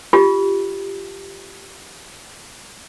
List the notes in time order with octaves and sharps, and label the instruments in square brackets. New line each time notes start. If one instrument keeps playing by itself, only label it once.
[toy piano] F4 G4